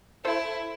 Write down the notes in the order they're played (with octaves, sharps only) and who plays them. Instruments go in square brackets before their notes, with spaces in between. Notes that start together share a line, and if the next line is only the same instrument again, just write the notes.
[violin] E4 [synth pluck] A4 C5